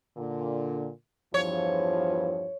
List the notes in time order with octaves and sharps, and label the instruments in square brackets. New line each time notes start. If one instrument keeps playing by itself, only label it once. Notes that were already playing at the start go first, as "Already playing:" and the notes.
[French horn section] A#2 D3
[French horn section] E2 G2 F3 [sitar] C#5